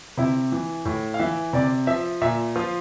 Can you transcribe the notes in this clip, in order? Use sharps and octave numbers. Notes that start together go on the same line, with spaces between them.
C3 E4
E3
A2
F5
E3 E5
C3 D5
F3 E5
A#2 E5
F3 F4